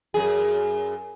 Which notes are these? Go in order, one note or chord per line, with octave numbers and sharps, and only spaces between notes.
F#2 G#4